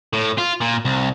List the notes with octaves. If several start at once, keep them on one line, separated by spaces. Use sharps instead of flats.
A2
F4
A#2
C2